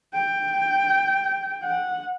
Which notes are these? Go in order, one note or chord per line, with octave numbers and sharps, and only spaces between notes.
G5
F#5